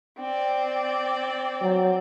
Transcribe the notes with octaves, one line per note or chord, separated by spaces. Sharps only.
C4 D5
F#3